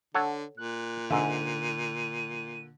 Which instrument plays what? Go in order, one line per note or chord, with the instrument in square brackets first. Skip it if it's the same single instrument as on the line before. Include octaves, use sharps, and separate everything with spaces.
[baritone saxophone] D3 [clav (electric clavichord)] A4 C#5 F#5
[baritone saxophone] A#2 [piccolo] F#6
[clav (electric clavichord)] G#2 E5 [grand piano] D3 [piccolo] D#7